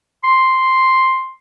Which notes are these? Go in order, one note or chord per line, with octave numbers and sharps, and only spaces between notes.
C6